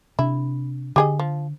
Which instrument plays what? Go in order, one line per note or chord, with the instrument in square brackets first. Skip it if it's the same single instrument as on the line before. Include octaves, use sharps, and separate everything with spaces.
[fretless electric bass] C3 D4 [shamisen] E4
[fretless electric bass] D3 [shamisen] G4 G#4 D#5
[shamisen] F3